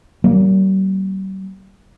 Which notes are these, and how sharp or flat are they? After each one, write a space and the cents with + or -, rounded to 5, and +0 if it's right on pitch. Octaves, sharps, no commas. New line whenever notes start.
G3 -40 A#3 +0